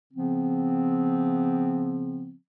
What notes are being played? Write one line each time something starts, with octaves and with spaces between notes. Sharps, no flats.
C#3 F3 B3 C4